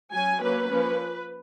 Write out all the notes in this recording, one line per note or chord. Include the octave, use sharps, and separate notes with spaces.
F#3 C#4 G#5
F#3 A#3 C#4 B4
F3 A#3 C#4